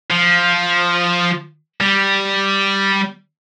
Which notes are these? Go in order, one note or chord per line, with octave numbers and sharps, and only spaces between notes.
F3
G3